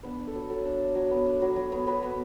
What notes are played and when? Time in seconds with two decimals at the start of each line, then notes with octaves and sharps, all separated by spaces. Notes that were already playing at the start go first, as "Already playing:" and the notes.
0.03 B3 D4 B4
0.19 D4
0.27 A4
0.35 F#3
0.50 F#3 A4
0.65 D4
0.80 D4
0.95 F#3
1.11 B3
1.26 D4
1.42 F#3
1.56 F#3
1.72 B3
1.87 F#3 B3 B4
2.03 B3